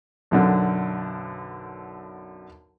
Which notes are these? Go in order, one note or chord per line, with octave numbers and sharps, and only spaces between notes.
B1 F#2 D3